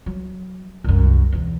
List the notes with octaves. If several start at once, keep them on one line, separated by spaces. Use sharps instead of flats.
F#3
C2 F#2
B1 E2